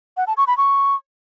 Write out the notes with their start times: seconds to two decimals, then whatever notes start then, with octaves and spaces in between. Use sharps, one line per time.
0.17 F#5
0.27 A5
0.37 C#6
0.47 B5
0.57 C#6